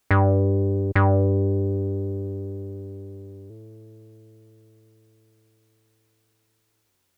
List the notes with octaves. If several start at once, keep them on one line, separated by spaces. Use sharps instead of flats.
G2
G2
A2
F#2